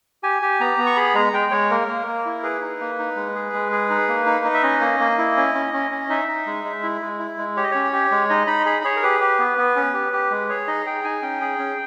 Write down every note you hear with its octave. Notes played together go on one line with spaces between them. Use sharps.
G4 G#5
G4
B3 A#5
B3
C#6
G#4 B5
G#3 A#5
G#3 G5
G#3 C#5
A#3 A#4
A#3
A#3
E4
G#4 B4
D#4
A#3
D#4
G#3
G#4
G#3
G#4
D#4
A#3
D#4
D#4
E5
C#4 D#5
A#3
A#3
E4
C#4
C#4
C#4
C#4
D#4 E5
D#4
G#3
G#3
E4
G#3
E4
G#3
G4 C#5
D#5
C#4 C#5
G4
G#3
D#4 D#5
D#4 B5
G#4 B5
G#4 C#5
A#4
G4 B4
G4
B3
B3
C#4
G4
G4
G#3
G#4 C#5
D#4 D#5
G#4 G5
D#4 G#5
C#4 G5
G#4
C#4